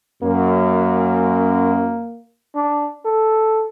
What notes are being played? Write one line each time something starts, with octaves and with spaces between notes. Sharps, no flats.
F#2 A#3
D4
A4